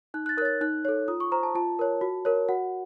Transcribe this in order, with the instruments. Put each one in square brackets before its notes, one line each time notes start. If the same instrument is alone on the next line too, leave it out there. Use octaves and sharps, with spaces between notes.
[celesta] D#4 F#6
F#6
A6
A#4 F#6
C#5 A6
D#4 F#6
A4 C#5
F4 D#6
C#6
C5 A#5
A5
F4 A5
A#4 C#5
F#4
A#4 C#5
F#4 F#5